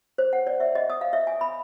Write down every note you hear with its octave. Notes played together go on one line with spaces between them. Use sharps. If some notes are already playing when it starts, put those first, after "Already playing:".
C5
F#5
D5
E5
D#5
D#6
F5
E5
G#5
B5